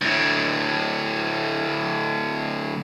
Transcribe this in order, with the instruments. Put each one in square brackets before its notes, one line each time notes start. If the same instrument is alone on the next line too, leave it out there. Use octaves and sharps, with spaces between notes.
[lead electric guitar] D2 A2